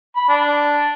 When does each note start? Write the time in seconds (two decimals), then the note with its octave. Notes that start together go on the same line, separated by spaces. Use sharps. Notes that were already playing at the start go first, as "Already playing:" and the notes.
0.16 B5
0.29 D4